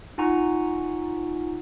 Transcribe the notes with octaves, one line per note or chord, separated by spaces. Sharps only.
D#4 F4 F#5 G#5 A#5 C#6